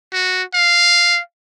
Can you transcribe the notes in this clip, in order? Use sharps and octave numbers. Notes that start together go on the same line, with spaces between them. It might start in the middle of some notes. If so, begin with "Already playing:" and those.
F#4
F5